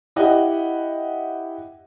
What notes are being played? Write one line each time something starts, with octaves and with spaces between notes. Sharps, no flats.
E4 G4 D#5 F#5